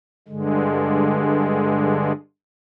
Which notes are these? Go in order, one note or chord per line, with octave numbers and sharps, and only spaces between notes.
G2 D3 G#3